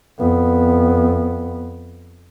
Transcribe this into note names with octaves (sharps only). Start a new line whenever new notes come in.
F2 B3